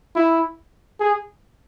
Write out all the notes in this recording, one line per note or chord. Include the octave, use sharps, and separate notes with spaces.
E4
G#4